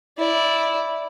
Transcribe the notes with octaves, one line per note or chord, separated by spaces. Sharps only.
E4 D5